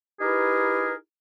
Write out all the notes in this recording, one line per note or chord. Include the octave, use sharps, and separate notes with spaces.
D#4 E4 G4 G#4 A#4 B4